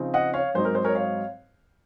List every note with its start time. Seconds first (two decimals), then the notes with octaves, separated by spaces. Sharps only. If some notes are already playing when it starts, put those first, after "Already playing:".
Already playing: C#3 F3 C4 D#4
0.14 D#5 F#5
0.34 C#5 F5
0.54 G#2 F#3 C4 D#4 C5
0.65 A#4
0.75 C5
0.85 A#4 C#5
0.95 C#5 F5